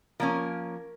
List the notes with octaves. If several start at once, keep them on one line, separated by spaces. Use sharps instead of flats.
F3 A#3 C#4 A#4